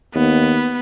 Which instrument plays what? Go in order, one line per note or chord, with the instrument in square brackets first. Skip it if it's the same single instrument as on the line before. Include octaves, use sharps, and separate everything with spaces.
[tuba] D#2 [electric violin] B3